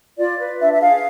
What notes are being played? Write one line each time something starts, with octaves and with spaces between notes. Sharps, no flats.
F4 D5
B4
D4 E5
E5
G#4 F5